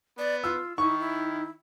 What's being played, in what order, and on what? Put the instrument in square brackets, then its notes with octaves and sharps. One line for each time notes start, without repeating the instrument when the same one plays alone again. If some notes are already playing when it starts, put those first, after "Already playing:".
[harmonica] B3 [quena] D5
[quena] F4 [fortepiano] E6
[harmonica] D#3 [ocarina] D#4 [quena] E4 [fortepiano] C#6
[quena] E4